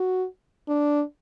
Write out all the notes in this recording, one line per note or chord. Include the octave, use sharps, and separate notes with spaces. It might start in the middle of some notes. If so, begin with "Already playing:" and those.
Already playing: F#4
D4